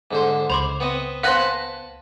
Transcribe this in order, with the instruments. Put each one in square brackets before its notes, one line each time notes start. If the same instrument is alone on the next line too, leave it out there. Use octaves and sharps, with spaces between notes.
[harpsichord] G#2 D3 C5
[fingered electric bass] C#2 [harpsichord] C5 [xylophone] B5 C6 D6
[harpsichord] B3 C4 D#5
[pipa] B3 C5 [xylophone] F5 F#6 A#6 [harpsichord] F#5 G#5 B5
[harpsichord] A5